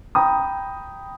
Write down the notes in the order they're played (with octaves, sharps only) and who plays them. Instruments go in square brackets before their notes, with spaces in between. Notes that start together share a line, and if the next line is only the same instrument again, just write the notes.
[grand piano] G5 A#5 B5 D#6